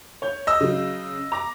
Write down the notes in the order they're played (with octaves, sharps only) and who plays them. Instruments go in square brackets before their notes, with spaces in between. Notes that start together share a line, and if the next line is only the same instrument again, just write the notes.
[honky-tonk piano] C#5 G6
[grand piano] D#5 E6
[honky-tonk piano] C#3 F#3
A#5 D6 A#6